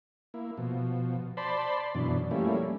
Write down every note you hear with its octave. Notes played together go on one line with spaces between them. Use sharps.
A#3 E4
B2 F3
C5 D5 A5 B5 C6
F#2 B2 E3 D4
F3 G3 A3 A#3 C#4 E4